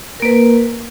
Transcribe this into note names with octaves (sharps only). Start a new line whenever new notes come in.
A#3 A#4 B4